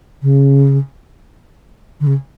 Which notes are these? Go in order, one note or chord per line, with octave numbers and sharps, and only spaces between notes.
C#3
D3
C#3